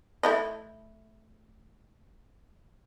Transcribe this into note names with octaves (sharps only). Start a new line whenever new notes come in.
A3 E4 D#5